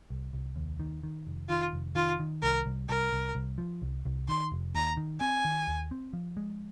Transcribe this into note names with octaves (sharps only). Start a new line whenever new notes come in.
C2
C2
D#2
D#3
D#3
F1
D#3 F4
F1
D#3 F4
D#3
C2 A#4
C2
C2 A#4
C2
C2
F3
C2
C2
D#3 C6
F1
D#2 A#5
D#3
C4 G#5
D#3
D#2
C4
F3
G#3